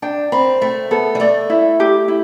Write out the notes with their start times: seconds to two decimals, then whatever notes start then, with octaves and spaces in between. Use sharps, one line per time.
0.02 D4 G5
0.32 C4 B5
0.61 A3 E5
0.91 B3 A4
1.15 G3
1.20 A3 D5
1.50 E4
1.80 G4
2.08 E4